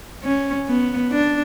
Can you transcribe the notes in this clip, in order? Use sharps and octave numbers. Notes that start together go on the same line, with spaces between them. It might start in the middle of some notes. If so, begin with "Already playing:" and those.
C#4
B3
D4